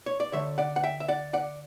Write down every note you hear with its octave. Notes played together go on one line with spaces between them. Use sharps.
C#5
D5
D2 D3 A3 C#5 E5
D5 F#5
F#5
E5 G5
E5
D5 F#5
D5 F#5